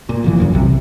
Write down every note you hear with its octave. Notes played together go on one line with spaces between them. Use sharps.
A#2
F1 F2 E3
D1 G1 F#2
B1 C3